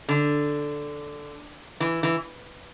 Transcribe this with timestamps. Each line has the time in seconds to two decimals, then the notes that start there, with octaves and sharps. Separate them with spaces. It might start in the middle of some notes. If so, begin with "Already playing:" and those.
0.09 D3
1.80 E3
2.03 E3